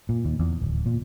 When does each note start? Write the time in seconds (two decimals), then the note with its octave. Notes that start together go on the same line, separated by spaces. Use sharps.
0.09 A#2
0.25 D#2
0.39 E2
0.62 D1
0.86 A#2